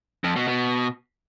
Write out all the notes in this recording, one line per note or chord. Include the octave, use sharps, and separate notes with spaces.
F2
B2
B2